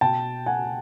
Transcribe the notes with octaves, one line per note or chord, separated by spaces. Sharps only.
B2 G5 A5
F#5 G#5